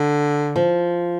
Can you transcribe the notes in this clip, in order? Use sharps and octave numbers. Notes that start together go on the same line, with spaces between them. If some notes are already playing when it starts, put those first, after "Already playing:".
Already playing: D3
F3